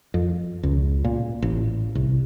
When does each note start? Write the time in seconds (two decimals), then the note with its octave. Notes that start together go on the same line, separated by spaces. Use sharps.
0.14 F2
0.63 C#2
1.05 A#2
1.42 A1
1.95 C2